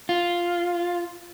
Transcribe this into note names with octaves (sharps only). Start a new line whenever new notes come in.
F4